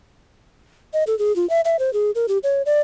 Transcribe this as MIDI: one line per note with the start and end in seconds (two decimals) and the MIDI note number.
0.93 1.04 75
1.07 1.17 69
1.19 1.35 68
1.36 1.48 65
1.50 1.61 76
1.65 1.79 76
1.79 1.93 72
1.93 2.11 68
2.15 2.26 70
2.28 2.38 67
2.43 2.62 73
2.66 2.81 74